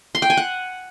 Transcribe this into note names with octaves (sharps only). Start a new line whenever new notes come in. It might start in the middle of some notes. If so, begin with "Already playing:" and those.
C6
G5
G#5
F#5